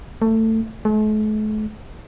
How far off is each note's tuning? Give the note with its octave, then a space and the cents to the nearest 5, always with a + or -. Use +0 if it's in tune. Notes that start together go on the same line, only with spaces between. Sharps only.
A3 +20
A3 -45